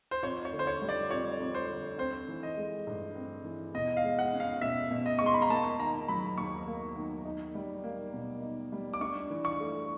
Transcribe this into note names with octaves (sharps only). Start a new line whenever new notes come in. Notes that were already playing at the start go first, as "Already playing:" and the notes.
C5
F2 C#5
C#5
D3
C5
C#5
G3
D5
F2 C#5
F2
C5
D3
C4 C5
E3
D#5
G#3
G2
C4
E3
B2 D#5
F5
G#3
F#5
C#4
F5
B2 E5
B2
D#5
G#3 C#6
C6
B5
A#5
A#3 A5
D#3 A#5
F#3 B5
D#2 C#6
A#3
D#3
D#4
G3
A#3
B2
D#4
G3
D6
D4 C#6
E3
C#6
A3